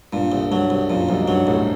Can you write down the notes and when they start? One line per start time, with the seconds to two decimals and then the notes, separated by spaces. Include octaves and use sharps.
0.13 G2 A#2
0.32 C2
0.51 G2 F#3
0.70 C2
0.90 F#2 A#2
1.09 C2 F#2
1.20 G#2
1.28 G2 F#3
1.47 C2 A2